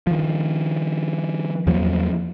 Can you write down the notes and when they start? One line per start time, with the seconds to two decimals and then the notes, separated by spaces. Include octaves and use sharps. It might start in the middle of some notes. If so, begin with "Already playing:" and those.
0.07 D#3 F3
1.67 E2 F3 F#3 A#3